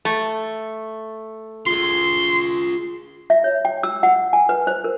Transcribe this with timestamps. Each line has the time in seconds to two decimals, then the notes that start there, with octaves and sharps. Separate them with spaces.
0.05 A3
1.67 F4 G#4 C6
3.30 E5
3.44 C#5
3.65 G5
3.83 E6
4.03 F#5
4.33 G#5
4.49 B4
4.67 C5
4.84 A#4